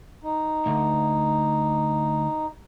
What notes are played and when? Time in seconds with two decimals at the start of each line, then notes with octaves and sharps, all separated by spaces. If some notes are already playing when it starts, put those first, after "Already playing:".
0.23 D#4
0.66 D2